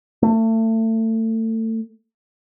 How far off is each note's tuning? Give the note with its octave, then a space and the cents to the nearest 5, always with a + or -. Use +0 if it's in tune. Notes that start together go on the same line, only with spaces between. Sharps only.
A3 +30